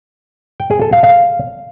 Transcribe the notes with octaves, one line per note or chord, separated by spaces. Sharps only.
G5
G#4
A4
F5
F5